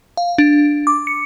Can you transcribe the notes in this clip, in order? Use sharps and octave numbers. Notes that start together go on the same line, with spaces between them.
F5
D4
D6
C#7